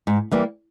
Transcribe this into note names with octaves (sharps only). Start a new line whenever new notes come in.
G#2
E3 G3 A#3